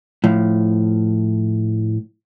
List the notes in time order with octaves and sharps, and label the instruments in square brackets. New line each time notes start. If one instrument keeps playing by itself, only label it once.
[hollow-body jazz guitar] A2 F3